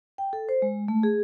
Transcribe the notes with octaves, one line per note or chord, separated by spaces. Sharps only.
G5
A4
C5
G#3
A3
G#4